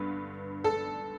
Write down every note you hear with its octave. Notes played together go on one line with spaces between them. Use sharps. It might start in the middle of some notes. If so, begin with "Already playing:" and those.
Already playing: G2 D3 B3 B4
A4